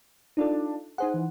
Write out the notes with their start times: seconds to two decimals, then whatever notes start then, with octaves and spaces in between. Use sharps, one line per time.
0.37 D4 D#4 F4 A4
0.98 D#4 G#4 C5 F#5
1.14 E3